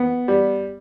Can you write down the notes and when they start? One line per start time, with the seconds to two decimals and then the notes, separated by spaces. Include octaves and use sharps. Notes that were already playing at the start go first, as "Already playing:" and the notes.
Already playing: B3
0.28 G3